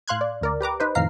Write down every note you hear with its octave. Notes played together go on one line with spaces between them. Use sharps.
A2 F5 C6 F#6 G#6
D5
D2 A#4 D5
G4 B4 A#5 D6
D#4 B4 C5
F2 A2 D#3 F5 A#5 C7